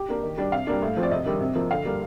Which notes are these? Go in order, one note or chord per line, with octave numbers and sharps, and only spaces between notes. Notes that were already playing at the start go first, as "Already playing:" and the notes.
Already playing: G4
A#3 D4
D#3
G3 D4
C3 F5
G3 A#3 D4
A2
F3 C4
D5
C3 D#5
D#3 G3 D4
C3
F3 A#3
D3 F5
G3 A#3